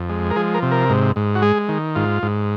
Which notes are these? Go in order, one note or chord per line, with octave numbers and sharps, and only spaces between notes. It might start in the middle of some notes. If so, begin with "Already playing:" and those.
Already playing: F2
G#3
A#4
F3 G#4
A#4
C3
A#4
G#2
G#2
F#4
G#3 G#4
D#3
G#2 F4
G#2